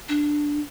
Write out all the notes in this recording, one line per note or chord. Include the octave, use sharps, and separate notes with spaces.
D4